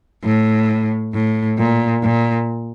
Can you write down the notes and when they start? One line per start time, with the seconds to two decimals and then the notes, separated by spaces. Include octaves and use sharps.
0.24 A2
1.14 A2
1.59 A#2
2.03 A#2